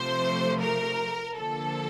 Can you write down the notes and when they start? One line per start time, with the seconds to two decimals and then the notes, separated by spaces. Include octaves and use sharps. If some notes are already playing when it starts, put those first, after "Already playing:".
Already playing: C3 F3 A3 C5
0.60 A#4
1.36 D3 F3 A#3 A4